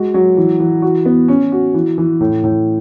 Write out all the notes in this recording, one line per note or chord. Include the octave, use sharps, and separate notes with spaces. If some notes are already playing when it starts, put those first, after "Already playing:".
Already playing: G#3 F#4
F#3
E3
E3
F#4
B3
C#4
F#4
E3
E3
A2
A2